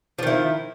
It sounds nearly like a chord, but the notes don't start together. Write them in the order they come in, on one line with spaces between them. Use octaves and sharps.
F3 D#3 E4